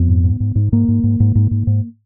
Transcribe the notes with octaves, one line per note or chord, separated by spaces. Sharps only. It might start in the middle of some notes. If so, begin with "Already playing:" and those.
Already playing: F2 B3
G#2
G#2
G#2
G#2
G#2 A#3
G#2
G#2
G#2
G#2
G#2
G#2